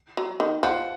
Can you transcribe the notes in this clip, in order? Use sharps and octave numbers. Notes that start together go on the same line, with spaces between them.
F#3
D#3
F3 F#5